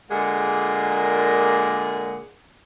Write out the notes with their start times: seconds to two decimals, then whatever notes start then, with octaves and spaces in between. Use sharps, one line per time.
0.10 A#2 D3 G#3 A#3 G#4 F#5